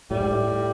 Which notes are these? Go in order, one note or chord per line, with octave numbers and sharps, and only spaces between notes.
A2 G3
G#2
A2